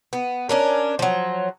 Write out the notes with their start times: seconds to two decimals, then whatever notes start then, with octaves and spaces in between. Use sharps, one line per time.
0.13 B3
0.49 C#4 D4 A#4
0.99 F3 F#3